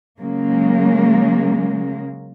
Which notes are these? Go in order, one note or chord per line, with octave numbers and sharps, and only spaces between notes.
C#3 F#3 G#3 A#3